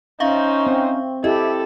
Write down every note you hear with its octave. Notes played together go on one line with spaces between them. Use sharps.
C#4 D#4 C5 E5 F5 C#6
C4
E4 G4 A4 D#5 E5